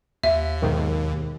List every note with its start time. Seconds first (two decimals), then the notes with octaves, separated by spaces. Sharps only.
0.23 D#2 E5
0.62 B1 G#2 D#3